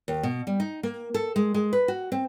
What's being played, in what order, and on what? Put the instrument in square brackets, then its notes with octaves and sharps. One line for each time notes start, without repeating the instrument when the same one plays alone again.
[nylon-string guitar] D#2
B2
G3
D#4
A#3
A4
G#3
G#3
B4
F#4
C4